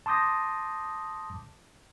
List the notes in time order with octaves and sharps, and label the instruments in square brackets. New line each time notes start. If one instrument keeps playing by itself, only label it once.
[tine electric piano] A5 C6 D6 D#6 G6 A#6